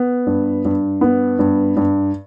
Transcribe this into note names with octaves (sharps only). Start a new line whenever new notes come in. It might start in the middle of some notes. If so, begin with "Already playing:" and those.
Already playing: B3
G2
G2
B3
G2
G2